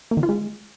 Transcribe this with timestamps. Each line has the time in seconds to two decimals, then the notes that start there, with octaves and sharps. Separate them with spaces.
0.11 A#3
0.17 D#3
0.23 F4
0.29 G#3